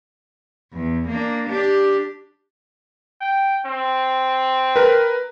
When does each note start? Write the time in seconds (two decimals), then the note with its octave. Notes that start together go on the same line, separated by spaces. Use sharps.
0.73 E2
1.08 A#3 D4
1.48 D4 G4
3.21 G5
3.65 C4
4.76 A#4 B4